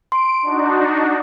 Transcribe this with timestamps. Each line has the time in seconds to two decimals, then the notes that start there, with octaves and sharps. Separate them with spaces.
0.12 C6 D7
0.42 D4 D#4 F#4